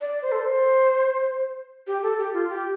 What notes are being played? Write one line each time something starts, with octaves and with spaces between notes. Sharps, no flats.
D5
C5
A4
C5
G4
A4
G4
F4
G4